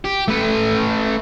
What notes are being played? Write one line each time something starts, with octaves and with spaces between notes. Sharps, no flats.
G4
A3 B4